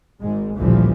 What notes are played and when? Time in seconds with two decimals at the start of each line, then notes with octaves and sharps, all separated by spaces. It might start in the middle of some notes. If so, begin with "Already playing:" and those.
0.20 G#1 G#2 G#3
0.56 A1 D2 A#2 E3 F3 G3